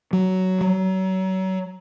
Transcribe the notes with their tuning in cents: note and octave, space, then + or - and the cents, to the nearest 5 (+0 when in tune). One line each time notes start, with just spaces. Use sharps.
F#3 +10
F#3 +30